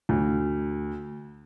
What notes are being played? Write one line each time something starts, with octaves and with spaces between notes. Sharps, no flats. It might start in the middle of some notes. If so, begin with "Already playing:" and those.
D2